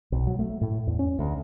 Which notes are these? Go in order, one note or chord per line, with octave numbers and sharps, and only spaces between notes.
B1
F#3
A3
A2
E2
C#4
D2